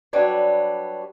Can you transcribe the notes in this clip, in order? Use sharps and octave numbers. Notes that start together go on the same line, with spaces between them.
F#3 G3 D4 B4 C#5